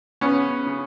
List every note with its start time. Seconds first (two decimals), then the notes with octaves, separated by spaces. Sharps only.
0.21 C#3 B3 C#4
0.66 C#3